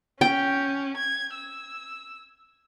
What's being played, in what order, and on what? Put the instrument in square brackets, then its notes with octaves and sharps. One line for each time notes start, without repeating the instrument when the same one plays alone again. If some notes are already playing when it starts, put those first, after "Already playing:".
[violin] C#4 [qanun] G5
[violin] G#6
E6